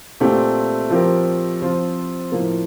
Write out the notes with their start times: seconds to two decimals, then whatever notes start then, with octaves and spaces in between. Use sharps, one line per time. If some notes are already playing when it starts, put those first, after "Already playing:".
0.20 A#2 A3 C4 G4
0.90 F3 C4 G4 A#4
1.62 F3 C4 F4
2.32 A2 F3 A#3